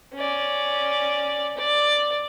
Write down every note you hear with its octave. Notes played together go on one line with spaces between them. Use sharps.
C#4 D5
D5